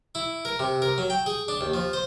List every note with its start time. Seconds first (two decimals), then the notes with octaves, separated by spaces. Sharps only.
0.15 E4
0.45 A#4
0.59 C3
0.82 A#4
0.98 F#3
1.10 G5
1.26 G#4
1.48 D4
1.61 D#2
1.74 F3
1.93 C5